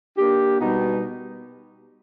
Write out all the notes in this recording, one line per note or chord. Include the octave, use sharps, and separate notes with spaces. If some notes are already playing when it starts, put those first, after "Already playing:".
A#3 D4 G4
B2 G3 B3 D#4